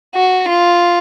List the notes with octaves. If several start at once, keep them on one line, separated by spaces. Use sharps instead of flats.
F#4
F4